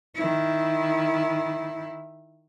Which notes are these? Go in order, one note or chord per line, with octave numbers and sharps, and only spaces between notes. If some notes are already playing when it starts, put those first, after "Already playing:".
D#3 E4